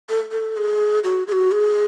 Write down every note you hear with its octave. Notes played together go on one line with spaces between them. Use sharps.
A4
A4
G#4
F#4
G#4
F#4
G#4